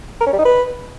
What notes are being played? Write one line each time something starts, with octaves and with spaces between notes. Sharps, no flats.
A#4
C#4
G3
D#4
B4